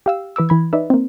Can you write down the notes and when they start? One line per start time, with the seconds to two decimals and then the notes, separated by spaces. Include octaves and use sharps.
0.06 G4 F5 E6
0.36 E3 B4 D6 E6
0.49 E3 B5 G#6
0.73 D#4 B4 D5 E5
0.90 A#3 C4